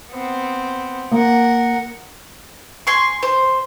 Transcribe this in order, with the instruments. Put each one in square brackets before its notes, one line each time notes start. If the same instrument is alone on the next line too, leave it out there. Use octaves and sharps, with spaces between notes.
[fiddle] B3 C4
[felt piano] A#3 [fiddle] A#4 F#5
[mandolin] G#5 C6 C#6
C5